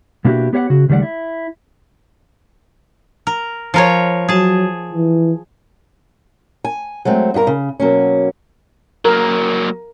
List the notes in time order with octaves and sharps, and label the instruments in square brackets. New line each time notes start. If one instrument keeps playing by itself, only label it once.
[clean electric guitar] B2 A#3 D4 E4 F#4 G4
B3 G4 C#5 F5 F#5
C#3 F#4
C#2 D#3 G3 A3 D5 F#5
E4
[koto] A#4
F3 A#4 C#5
[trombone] F#3 [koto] G#4 A5
[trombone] E3
[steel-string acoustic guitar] G#5
F#3 G#3 A3 C4
G2 B3 G4 A#4
C#3
B2 F#3 A#3 C#4
[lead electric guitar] F#3 A#3 [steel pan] A#4